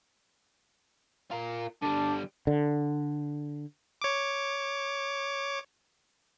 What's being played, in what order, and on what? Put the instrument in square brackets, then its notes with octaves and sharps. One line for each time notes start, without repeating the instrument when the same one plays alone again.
[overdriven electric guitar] F4 A#4
[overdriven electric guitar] D3 G3 [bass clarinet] D4
[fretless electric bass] D3
[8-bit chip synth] C#5 D6